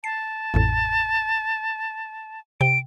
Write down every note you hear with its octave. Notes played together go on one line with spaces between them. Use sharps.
A5 C7
A1 F2 A2
C3 G5 D7